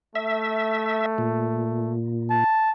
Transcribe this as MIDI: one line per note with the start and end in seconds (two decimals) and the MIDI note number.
0.15 1.94 57
0.15 1.06 76
1.18 2.44 46
2.30 2.71 81